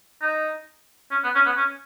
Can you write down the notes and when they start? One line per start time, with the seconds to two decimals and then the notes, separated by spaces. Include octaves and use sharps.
0.21 D#4
1.11 C#4
1.24 B3
1.35 C#4
1.45 B3
1.57 C#4